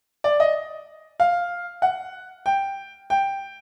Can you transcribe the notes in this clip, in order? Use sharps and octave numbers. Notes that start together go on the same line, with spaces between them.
D5
D#5
F5
F#5
G5
G5